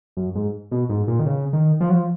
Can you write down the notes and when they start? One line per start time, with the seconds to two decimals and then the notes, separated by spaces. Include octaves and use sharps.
0.17 F#2
0.35 G#2
0.71 B2
0.89 G#2
1.07 A#2
1.19 D#3
1.26 C#3
1.53 D#3
1.80 F3
1.89 F#3
1.94 F3